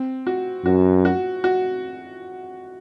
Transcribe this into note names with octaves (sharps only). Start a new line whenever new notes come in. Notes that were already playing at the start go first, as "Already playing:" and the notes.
Already playing: C4
F#4
F#2 F#4
F#4
F#4